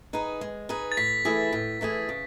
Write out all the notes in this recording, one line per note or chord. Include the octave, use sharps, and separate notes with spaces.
D#4 G#4 B4
G#3
D#4 G#4 B4
A6
A2 B6
E3 A3 E4 G#4
A2
E3 A3 E4 G#4
C#3